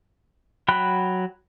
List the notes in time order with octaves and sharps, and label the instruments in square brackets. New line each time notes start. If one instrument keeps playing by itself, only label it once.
[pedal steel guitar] F#3 G5 B5 F#6